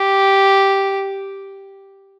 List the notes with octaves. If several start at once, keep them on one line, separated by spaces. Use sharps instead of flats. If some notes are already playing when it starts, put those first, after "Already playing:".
Already playing: G4